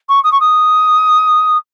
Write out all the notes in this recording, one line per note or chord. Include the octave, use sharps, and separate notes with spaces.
C#6
D#6
C#6
D#6